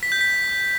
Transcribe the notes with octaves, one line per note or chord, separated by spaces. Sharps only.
B6
G6
B6